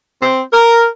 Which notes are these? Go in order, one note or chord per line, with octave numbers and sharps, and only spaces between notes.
C4
A#4